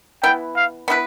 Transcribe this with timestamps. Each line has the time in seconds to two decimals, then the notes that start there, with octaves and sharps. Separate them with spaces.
0.23 E3 B3 E4 G5
0.56 F5
0.88 B3 E4 B4